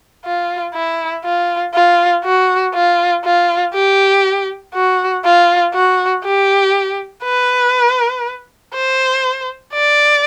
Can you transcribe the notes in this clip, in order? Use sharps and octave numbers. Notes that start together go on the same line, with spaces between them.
F4
E4
F4
F4
F#4
F4
F4
G4
F#4
F4
F#4
G4
B4
C5
D5